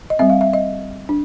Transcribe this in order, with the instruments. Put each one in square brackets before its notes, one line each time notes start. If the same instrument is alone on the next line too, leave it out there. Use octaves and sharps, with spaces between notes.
[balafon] D#5
G3 C4 E5
F5
E5
D#5
D4